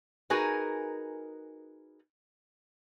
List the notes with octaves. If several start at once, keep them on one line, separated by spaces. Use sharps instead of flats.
D#4 F#4 G#4 A#4 B4 G#5